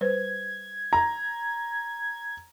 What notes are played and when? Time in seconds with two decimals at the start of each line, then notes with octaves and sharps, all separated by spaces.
0.01 G3 B4 C5 G#6
0.93 A#5